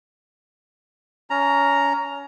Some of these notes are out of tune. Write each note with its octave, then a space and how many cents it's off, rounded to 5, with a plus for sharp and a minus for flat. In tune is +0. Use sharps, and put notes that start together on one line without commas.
C#4 +25 A#5 +0